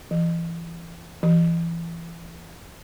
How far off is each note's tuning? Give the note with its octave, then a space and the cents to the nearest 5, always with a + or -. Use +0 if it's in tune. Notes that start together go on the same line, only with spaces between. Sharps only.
E3 +30
E3 +30